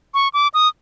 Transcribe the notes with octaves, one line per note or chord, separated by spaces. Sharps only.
C#6
D6
D#6